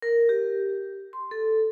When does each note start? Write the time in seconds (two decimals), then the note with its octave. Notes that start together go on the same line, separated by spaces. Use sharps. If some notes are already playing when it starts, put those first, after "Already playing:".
0.02 A#4
0.29 G4
1.13 C6
1.31 A4